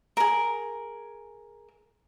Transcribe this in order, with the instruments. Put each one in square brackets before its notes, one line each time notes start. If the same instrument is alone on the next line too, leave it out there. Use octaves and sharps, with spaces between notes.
[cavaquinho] G#4 A#4